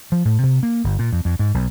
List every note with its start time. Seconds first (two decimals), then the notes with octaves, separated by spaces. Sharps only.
0.12 F3
0.25 A2
0.43 C3
0.63 A#3
0.84 G1
0.99 A#2
1.13 F2
1.25 F2
1.39 G#2
1.54 B1